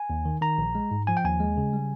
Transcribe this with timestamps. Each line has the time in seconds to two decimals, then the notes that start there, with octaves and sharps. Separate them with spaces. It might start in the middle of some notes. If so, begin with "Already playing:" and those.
Already playing: G#5
0.10 D#2
0.25 D#3
0.41 D#3 A#5
0.58 A#1
0.75 G#3
0.91 G#2
1.07 F3 G#5
1.17 G5
1.24 D#2 G#5
1.40 G#3
1.57 C#3
1.73 G3